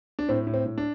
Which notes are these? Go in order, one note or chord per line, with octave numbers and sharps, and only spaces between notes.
D4
A2 C4
A2
C4
A2
D4